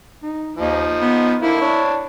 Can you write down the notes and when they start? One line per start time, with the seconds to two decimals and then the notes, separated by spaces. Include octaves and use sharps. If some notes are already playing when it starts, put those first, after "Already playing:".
0.23 D#4
0.57 D#2 F3 D#4
1.00 B3
1.42 D3 A#3 E4
1.61 D4 C#5